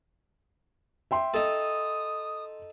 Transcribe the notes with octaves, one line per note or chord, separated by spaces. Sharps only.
E5 G5 C6
D#4 A4 D#6